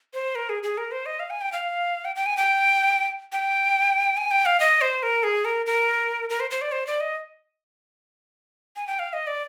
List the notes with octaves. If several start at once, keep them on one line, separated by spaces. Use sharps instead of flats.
C5
A#4
G#4
G#4
A#4
C5
D#5
F5
G#5
G5
F5
G5
G5
G#5
G5
G5
G#5
G5
F5
D#5
C5
A#4
G#4
A#4
A#4
A#4
C5
C5
D5
C5
D5
D#5
G#5
G5
F5
D#5
D5